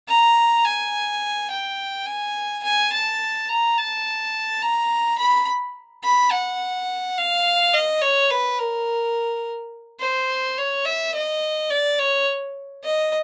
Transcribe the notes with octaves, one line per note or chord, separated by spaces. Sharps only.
A#5
G#5
G5
G#5
G#5
A5
A#5
A5
A#5
B5
B5
F#5
F5
D#5
C#5
B4
A#4
C5
C#5
E5
D#5
D5
C#5
D#5